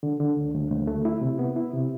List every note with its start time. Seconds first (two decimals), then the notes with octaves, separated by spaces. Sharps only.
0.03 D3
0.20 D3
0.37 D2
0.54 D2
0.71 D2
0.87 A3
1.05 E4
1.21 C3
1.39 B3
1.56 E4
1.73 C3